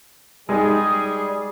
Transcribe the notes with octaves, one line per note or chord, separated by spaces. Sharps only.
G3 G#3 D#4 G#4